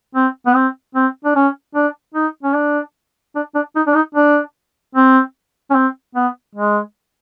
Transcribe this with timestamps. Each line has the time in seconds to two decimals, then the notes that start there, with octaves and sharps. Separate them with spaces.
0.15 C4
0.46 B3
0.55 C4
0.95 C4
1.24 D4
1.36 C#4
1.75 D4
2.14 D#4
2.43 C#4
2.55 D4
3.36 D4
3.55 D4
3.76 D#4
3.87 D4
3.95 D#4
4.15 D4
4.95 C4
5.70 C#4
5.75 C4
6.15 B3
6.55 G#3